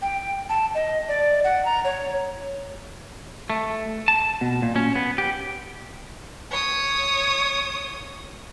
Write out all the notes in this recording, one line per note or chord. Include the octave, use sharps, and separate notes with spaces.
G5
A5
D#5
D5
F#5
A#5
C#5
A3
A5
B2
A#2
C#4
B3
G4
C#5 D#6